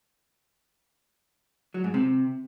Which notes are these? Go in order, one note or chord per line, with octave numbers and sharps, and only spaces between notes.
F#3
G#2
C3